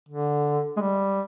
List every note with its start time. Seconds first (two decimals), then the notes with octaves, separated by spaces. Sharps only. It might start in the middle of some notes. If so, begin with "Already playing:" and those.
0.08 D3
0.77 G#3
0.80 G3